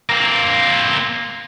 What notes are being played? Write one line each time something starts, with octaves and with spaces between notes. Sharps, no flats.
A#3 C4